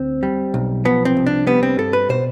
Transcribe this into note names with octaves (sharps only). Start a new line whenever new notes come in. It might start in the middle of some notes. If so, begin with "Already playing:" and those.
Already playing: D2 C4
G3
B1
F3 B3
C4
C2
D4
G3 B3
C4
G2 A4
B4
B2 C5